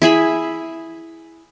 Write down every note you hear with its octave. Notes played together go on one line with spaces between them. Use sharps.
E4 G#4 E5 B5